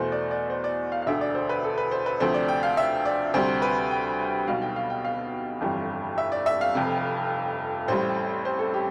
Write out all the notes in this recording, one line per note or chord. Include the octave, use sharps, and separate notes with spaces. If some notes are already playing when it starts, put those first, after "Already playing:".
Already playing: E2 B2 A3 C5
D5
D5
C5
D5
F5
F5
E1 D2 D3 E5
D5
C5
B4
A4
B4
C5
B4
D2 C3 F3 A3 C5
D5
G5
F5
E5
D5
D2 C3 G3 C5
B4
G5
B1 B2 G3 F5
G5
F5
G5
F5
G1 F2 E3 G3
E5
D5
E5
F5
F1 F2 C3
A1 A2 G3 C5
C5
A4
G4